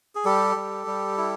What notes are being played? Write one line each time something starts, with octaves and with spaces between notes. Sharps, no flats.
G#4
G3 G4 A4
G3
G3
E4